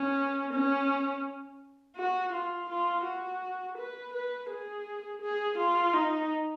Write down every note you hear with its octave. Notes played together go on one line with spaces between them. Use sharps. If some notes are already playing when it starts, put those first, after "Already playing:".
Already playing: C#4
C#4
F#4
F4
F4
F#4
B4
B4
G#4
G#4
F4
D#4